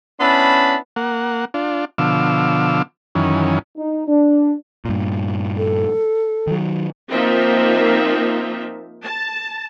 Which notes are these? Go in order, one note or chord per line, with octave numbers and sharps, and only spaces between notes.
B3 C#4 D4 E4 A5 B5
A#3 F#5
D4 F4
B2 D3 F3 F5 D6 E6
F#2 D#3 E3 C#4
D#4
D4
G2 A#2
A4
D#3 F#3
F3 A#3 C4 D#4 F4 E5
A5